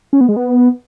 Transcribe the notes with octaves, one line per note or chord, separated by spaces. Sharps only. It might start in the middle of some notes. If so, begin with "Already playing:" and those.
C#4
B3
G#3
B3